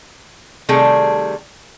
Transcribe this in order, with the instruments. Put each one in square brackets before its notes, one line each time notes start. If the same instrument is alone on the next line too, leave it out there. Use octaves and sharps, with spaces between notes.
[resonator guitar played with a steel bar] C3 D#3 G3 A3 G#4 A4